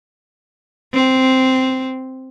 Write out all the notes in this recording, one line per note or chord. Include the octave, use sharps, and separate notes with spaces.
C4